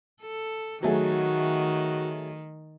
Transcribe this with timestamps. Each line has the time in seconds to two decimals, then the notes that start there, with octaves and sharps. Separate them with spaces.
0.22 A4
0.83 D#3 F#3 A3 F#4 G#4